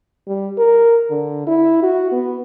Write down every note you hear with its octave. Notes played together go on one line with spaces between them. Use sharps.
G3
A#4
D3
E4
F#4
B3